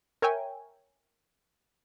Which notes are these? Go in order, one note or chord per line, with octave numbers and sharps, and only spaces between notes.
A#4 C#5 E5 G5 G#5